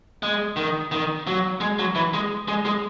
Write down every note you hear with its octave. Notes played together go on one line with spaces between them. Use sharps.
G#3
D#3
D#3
F#3
G#3
F#3
E3
G#3
G#3
G#3